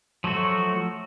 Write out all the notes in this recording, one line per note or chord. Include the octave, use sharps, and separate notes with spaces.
F3 F#3 A3 F#4